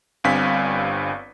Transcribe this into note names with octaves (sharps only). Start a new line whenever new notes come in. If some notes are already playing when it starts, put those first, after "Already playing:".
G1 G2 C4 F5 G#5 B6